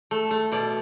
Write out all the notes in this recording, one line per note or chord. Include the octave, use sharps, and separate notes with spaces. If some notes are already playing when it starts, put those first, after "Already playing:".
A3
A3
B2 D5